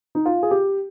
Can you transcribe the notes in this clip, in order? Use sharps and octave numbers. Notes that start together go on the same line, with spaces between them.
D#4
F4
G#4
G4